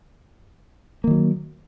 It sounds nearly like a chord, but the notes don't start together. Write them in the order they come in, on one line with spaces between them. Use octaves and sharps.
A#3 D#3 F#3